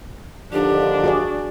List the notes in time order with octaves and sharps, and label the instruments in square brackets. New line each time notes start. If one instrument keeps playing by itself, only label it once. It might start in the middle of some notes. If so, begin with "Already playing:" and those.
[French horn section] D#2 D3 F3 [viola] D4 [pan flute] G4
[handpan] F#4 G#4 D5